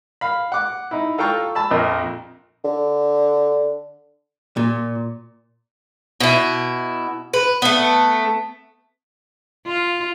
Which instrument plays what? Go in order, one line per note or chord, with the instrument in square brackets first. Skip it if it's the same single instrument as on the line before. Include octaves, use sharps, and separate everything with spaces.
[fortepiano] F5 B5
F#5 D6
D#4 E4
F4 A4 F5 G5 A#5 C#6
A5 B5 E6
A#1 F2 A#4 D#5
[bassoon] D3
[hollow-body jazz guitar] A#2
[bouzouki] B2 E4
B4
A3 B3
[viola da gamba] F4